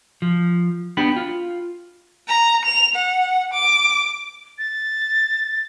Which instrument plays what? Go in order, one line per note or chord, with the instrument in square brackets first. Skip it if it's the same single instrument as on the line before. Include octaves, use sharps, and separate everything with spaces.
[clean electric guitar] F3
B3 D4 G4 B5
F4
[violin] A#5
F7
F#5
D6
[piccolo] A6